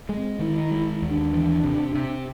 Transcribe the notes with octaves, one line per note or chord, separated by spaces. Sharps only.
G#3
C4
D#3 E4
E4
G#3
D#2
D4
E3
C3
C3